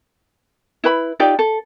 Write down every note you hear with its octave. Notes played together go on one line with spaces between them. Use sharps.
E4 B4 B5
D#4 F4 G4 D5
A4